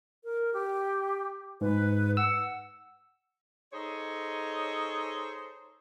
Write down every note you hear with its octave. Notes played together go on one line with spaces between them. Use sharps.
A#4
G4
G#2 B4
F#5 E6
D#4 G#4 A4 C5 C#5 D#5